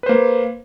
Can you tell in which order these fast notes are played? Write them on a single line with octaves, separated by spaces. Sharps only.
B4 C5 A#3